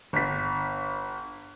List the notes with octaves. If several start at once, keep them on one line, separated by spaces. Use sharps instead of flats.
G1 B6